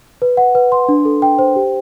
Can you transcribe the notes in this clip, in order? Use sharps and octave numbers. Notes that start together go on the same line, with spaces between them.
B4
F#5
B4
C6
D4
A4
G5
C5
G4